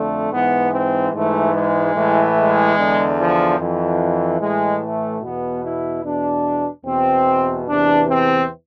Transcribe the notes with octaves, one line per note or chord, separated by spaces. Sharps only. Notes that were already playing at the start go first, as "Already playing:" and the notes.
Already playing: F2 D3 A3
G#2 E3 B3
C4
G#2 E3 A3
G#3
A2 E3
G#3
E2 D3
F3
F2 E3
A2 E3 G#3
A3
E2 B2 B3
E4
E2 B2 D4
E2 B2 C4
E2 C3 E3 D4
C4